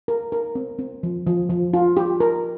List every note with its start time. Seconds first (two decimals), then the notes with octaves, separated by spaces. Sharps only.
0.08 A#4
0.32 A#4
0.55 C4
0.79 C4
1.03 F3
1.27 F3
1.50 F3
1.74 F4
1.97 G4
2.20 A#4